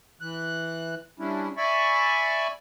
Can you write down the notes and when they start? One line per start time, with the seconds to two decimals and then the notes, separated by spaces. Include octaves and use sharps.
0.21 E3 F#6
1.20 G3 C#4 D4 E4
1.57 D5 E5 G#5 B5 C#6